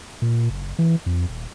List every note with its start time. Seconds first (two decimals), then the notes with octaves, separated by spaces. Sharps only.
0.22 A#2
0.50 F#1
0.79 E3
1.06 F2
1.29 D#1